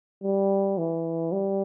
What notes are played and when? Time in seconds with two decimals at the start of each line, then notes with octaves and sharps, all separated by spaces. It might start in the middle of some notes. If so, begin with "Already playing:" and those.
0.24 G3
0.78 E3
1.32 G3